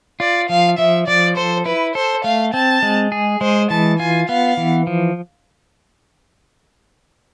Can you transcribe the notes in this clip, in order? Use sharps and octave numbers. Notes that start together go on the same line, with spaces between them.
F4 D5
F3 F5
F3 E5
F3 D5
A4 C5
E4 B4
A4 C5
A3 F5
C4 A5
G#3
G#4
G#3 C5
E3 A5
F4 G#5
B3 F5
E3
F3